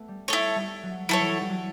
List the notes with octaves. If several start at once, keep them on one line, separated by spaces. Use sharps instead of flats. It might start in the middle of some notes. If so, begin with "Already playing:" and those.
Already playing: A3 B3
G3
A3 E4 A4 C#5
G3
F#3
F#3 E4 A4 C#5
E3
F#3
G3
F#3